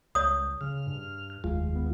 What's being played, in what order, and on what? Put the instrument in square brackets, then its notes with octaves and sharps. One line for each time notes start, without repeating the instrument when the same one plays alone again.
[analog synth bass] C#2 [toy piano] C#5 D#6
[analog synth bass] C#3 [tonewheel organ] F6
[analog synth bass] G2
[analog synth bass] F1 [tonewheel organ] D#2 G#3 F4
[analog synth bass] B3